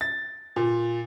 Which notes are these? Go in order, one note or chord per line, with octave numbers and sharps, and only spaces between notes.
A6
A#2